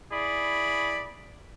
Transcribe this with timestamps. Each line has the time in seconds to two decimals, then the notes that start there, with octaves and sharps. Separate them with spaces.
0.11 E4 G#4 D5 B5